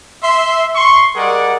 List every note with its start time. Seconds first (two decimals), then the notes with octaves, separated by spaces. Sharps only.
0.23 E5 C6
0.76 C6 C#6
1.16 G3 G#4 A#4 D5 D#5 F#5